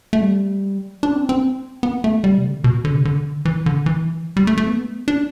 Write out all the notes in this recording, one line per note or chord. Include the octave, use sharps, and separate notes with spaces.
A3
G3
D4
C4
C4
B3
A3
G3
C3
D3
B2
D3
C3
D3
E3
D3
E3
G3
A3
A3
B3
D4